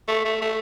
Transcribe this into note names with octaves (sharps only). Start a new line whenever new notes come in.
A3
A3
A3